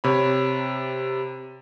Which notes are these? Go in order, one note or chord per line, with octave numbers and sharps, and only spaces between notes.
C3 C#5 B5